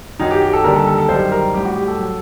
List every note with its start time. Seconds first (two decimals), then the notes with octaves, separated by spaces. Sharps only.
0.20 F#2 D#3 F#3 D#4
0.31 G4
0.42 G4
0.53 A4
0.64 D#2 D3 G3 A#4
0.76 A4
0.87 A4
0.98 A4
1.09 F#2 D#3 G3 C5
1.32 A#4
1.54 A2 G3 G4
1.65 F#4
1.76 G4
1.88 A4
1.99 F#3